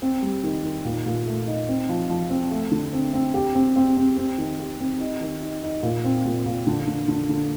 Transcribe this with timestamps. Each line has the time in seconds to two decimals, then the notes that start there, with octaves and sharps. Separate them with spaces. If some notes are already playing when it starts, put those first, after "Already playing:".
0.02 C4
0.23 G3
0.43 D#3
0.64 D#3
0.85 A#2
1.06 A#2
1.26 A3
1.47 D#4
1.68 C4
1.89 F3
2.10 F3
2.30 C4
2.51 A3
2.71 D3
2.93 C4
3.13 C4
3.34 G4
3.55 C4
3.76 C4
3.97 C4
4.17 C4
4.38 D#3
4.59 G4
4.80 C4
5.00 D#4
5.21 D#3
5.42 D#4
5.63 D#4
5.83 A#2
6.05 C4
6.26 A#2
6.46 A#2
6.67 D3
6.87 D3
7.08 D3
7.29 D3